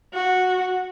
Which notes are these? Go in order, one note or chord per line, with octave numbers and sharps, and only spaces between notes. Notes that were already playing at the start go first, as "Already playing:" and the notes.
F#4